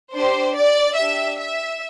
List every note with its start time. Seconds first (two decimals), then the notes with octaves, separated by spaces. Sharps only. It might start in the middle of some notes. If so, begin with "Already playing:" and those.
0.13 D4 G4 C5
0.55 D5
0.97 D4 G4 E5
1.39 E5